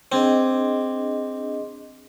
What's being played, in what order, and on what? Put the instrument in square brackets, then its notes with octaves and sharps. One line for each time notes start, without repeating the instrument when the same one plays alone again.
[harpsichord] C4 [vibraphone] D4 G#4 D#5